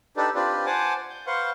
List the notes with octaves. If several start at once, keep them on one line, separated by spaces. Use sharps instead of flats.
D4 D#4 G4 A4 B4 D5
C4 D4 F4 G4 B4 D5
C5 F#5 G#5 A5 D6
G6
B4 C5 F5 F#5 C6 C#6